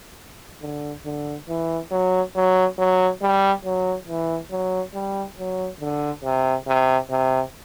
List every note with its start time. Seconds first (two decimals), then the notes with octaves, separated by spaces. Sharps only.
0.62 D3
1.06 D3
1.48 E3
1.91 F#3
2.35 F#3
2.78 F#3
3.22 G3
3.65 F#3
4.08 E3
4.51 F#3
4.94 G3
5.38 F#3
5.81 D3
6.24 C3
6.67 C3
7.11 C3